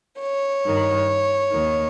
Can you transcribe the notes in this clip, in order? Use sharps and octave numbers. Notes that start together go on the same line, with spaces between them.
C#5
G2 D#3
D#2 D#3